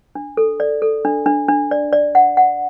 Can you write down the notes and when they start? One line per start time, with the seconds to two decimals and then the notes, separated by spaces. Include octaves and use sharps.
0.15 D4
0.37 A4
0.60 D5
0.82 A4
1.05 D4
1.26 D4
1.48 D4
1.71 D5
1.93 D5
2.15 F#5
2.37 F#5